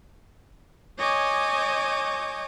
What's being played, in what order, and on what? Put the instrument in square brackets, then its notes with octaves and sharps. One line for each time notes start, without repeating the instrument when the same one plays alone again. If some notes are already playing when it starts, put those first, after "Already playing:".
[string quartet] C#5 D#5 G#5 D6 G6 G#6